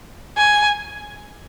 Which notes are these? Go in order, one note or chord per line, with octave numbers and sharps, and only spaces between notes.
G#5